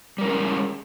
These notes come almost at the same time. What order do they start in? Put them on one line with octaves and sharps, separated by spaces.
G3 A#4 C#4 G#3